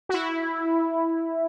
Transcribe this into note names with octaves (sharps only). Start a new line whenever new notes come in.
F#4
E4